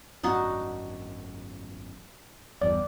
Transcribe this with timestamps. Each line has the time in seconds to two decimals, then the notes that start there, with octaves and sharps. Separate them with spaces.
0.23 G#1 F#2 D4 D#4 F#4
2.61 G1 E2 G2 D5